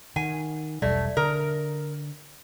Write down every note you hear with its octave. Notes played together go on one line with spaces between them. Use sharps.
D#3 F#5 G#5
E1 B1 G3 A3 D5 E5
D3 A4 A#4